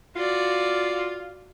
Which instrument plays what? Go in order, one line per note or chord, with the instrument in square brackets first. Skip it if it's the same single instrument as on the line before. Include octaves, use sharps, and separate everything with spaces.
[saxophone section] F4 [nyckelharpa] F#4 D5